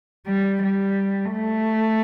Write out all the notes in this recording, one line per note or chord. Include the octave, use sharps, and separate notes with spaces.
G3
G3
A3